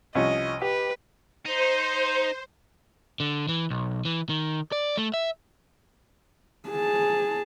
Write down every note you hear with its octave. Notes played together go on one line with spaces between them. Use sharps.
C2 F3 C#4 D#5
G4 B4
D#4 C5
D3
E3
B1
E3
D#3
D5
A3
E5
G#4 A5